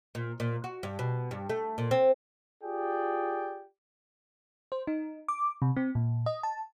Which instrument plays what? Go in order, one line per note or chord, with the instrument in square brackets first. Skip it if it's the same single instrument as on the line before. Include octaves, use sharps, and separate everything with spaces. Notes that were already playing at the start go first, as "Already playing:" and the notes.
[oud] A#2
A#2
F#4
G2
B2
G2
A3
A#2
C4
[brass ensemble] F4 G4 G#4 D5 G5
[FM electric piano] C5
D#4
D6
C3
C4
A#2
D#5
A5